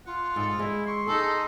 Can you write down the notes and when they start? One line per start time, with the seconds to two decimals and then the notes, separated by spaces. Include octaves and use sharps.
0.06 F4 F#5
0.36 G#2 A4
0.59 G#3 E4
0.87 C6 C#6
1.07 D#4 G#4 A4